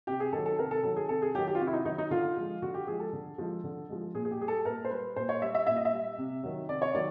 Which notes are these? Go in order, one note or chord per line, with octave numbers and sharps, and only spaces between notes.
C3 G4
G#4
D#3 F#3 A4
A4
C3 A#4
A4
D#3 F#3 A4
G#4
C3 A4
G#4
D#3 F#3 G4
G4
F4
C3 F#4
E4
D#4
D#3 F#3 D#4
D#4
D3 F4
F3 G#3
D3 F#4
G4
F3 G#3 G#4
A4
D3
F3 G#3
D3
F3 G#3
A#2 G#4
G#4
G4
G3 G#4
A4
A#2 A#4
C5
G3 B4
A#2 C5
C#5
G3 E5
E5
A#2 E5
D#5
E5
G3
C3
D#3 F#3
C3 D5
C#5
D#3 F#3 D5